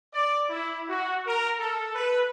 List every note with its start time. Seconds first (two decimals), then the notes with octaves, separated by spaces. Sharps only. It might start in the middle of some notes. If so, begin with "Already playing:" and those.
0.13 D5
0.50 E4
0.89 F#4
1.26 A#4
1.60 A4
1.94 B4